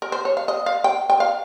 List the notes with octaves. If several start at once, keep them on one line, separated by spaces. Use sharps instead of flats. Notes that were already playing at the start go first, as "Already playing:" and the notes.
A#4
C5
C#5
F5
D#5
F5
G5
G5
F5